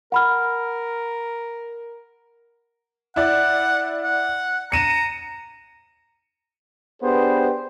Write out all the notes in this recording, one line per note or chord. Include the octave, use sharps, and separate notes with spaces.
A#4 F#5 B5 F6
E4 D5 F#5
F#5
A#5 C#7 D#7 E7
B3 D4 G4 G#4 B4 C5